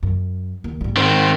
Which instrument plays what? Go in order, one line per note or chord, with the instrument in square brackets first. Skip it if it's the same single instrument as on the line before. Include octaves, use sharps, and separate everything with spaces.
[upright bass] F#2
D#2
G#2 G3
[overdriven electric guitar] D#3 C4